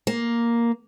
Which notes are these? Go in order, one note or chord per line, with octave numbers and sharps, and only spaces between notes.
A#3